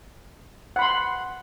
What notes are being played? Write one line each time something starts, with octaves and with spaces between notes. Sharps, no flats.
F#5 B5 C6